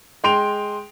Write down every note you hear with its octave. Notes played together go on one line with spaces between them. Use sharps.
G#3 G5 C6 D7 F7